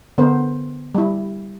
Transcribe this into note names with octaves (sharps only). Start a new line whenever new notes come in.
D3 B3 A#4 C5
G3 E4